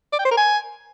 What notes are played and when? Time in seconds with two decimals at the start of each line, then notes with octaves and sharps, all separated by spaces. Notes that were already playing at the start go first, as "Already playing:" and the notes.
0.13 D5
0.19 G5
0.25 C5
0.31 A#4
0.37 G#5